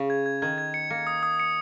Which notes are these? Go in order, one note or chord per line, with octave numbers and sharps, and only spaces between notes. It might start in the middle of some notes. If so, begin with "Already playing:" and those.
Already playing: C#3
G#6
G#6
D#3 G#6
G#6
C#7
A#3 C#7
D#6
D#6
C#7